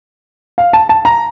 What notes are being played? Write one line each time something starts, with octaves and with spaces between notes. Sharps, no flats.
F5
A5
A5
A#5